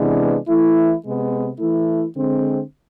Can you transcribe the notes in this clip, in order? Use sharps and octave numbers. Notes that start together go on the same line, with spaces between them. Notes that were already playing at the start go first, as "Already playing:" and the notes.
Already playing: C3 E3 G#3 B3 D4
E3 A3 E4
C3 G#3 B3
E3 A3 E4
D3 G#3 C4